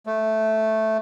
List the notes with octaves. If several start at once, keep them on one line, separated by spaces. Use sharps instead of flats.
A3